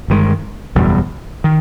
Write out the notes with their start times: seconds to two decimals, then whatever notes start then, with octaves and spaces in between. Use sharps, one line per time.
0.08 G1 G2 D#3 G#3
0.75 F#1 E2 B2 G3
1.44 D#3